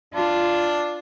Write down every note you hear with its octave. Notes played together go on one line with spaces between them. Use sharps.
D4 F4